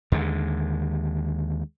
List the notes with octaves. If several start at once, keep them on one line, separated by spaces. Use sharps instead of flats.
D#2 D3 D#3 G#3